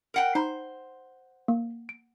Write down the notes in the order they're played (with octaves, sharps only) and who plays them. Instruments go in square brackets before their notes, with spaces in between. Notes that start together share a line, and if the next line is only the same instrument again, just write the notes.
[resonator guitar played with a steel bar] A#4 F#5 G5
[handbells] D#4 A#5 B5 [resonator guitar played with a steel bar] C5
[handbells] A#3
D7